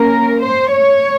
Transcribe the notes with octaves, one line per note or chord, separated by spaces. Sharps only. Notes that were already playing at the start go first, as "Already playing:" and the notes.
Already playing: A#3 C#4 A#4
C5
C#5